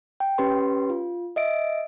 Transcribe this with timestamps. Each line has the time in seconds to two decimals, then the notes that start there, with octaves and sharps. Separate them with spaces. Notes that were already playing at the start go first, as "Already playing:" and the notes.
0.20 G5
0.38 C#4 G4 B4 C6
0.90 F4
1.36 D#5 E5 D7